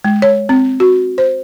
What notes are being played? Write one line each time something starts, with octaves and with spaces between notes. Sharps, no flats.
G#3
C#5
C4
F#4
C5